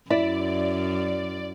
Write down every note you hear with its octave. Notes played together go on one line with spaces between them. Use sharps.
F#2 E4 D5